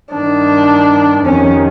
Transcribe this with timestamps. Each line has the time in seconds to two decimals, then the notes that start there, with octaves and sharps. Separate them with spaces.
0.12 G2 D#3 D4
1.25 F2 C3 D#3 C#4